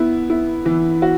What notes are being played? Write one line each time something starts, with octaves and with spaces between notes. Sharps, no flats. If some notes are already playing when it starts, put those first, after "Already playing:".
Already playing: B3 E4
E4
E3
F#4